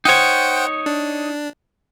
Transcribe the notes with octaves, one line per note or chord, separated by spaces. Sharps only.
D#4 C5 C#5 F#5 G5
D4